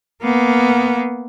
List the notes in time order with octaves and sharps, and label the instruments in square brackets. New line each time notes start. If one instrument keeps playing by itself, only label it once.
[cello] A#3 B3